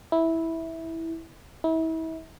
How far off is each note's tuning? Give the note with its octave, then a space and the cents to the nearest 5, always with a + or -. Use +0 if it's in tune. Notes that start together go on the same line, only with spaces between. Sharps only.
E4 -10
E4 -35